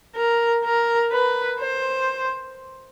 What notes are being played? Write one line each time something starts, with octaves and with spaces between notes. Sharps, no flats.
A#4
A#4
B4
C5